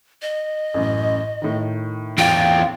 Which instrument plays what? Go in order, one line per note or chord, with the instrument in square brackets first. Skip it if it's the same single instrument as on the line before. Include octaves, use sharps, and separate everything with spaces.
[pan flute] D#5
[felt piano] A1 F#2
A2 D#3
[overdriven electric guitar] E2 F4 [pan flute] G5